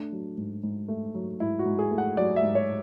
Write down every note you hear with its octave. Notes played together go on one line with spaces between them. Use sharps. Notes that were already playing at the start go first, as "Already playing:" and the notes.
Already playing: A3 D4
F#3
G#2
G#2
A3
F#3
G#2 E4
F#4
G#2
G#4
A3
F#5
F#3 D5
E5
G#2
C#5